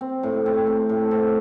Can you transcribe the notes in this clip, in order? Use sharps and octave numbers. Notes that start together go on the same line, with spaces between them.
C4
A2
C4
C4
A2
C4